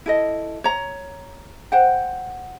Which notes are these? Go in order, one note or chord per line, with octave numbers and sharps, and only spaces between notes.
E4 A4 D#5
C#5 A#5
C5 F#5 G5